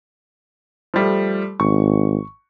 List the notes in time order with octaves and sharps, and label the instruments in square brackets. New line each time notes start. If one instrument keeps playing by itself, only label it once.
[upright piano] F3 G3 A3
[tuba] G#1 [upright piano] C#6